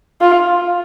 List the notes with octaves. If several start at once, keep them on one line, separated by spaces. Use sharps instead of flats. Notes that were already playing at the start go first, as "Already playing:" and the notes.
F4